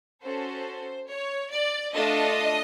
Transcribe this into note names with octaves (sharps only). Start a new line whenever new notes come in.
C#4 F#4 A4 C5
C#5
D5
A3 D4 F4 A4 D#5